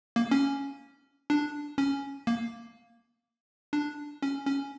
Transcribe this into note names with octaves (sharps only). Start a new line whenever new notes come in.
A#3
C#4
D4
C#4
A#3
D4
C#4
C#4